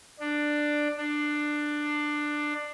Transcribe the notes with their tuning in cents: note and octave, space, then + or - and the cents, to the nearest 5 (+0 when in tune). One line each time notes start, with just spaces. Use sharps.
D4 +10
D4 +15